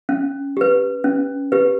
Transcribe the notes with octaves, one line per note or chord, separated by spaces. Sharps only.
C#4
G4 B4
C#4
G4 B4